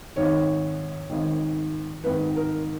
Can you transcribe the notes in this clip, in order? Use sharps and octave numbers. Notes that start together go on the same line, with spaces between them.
G#1 G#2 D#3 C#5
G#1 G#2 D#3
G#1 G#2 D#3 B4
A#4